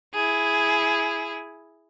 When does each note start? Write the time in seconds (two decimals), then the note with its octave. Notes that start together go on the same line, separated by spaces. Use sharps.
0.14 E4 G#4